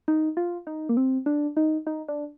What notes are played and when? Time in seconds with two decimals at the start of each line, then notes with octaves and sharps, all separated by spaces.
0.08 D#4
0.37 F4
0.67 D#4
0.89 A#3
0.97 C4
1.26 D4
1.57 D#4
1.87 D#4
2.08 D4